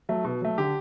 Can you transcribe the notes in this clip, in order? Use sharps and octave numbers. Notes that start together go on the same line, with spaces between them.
F#3 A3
B2
F#3 A3
D3 G4